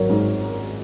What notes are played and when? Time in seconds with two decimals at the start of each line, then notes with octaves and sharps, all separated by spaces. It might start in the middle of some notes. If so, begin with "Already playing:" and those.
Already playing: G#1 F#3 A#4
0.10 G#2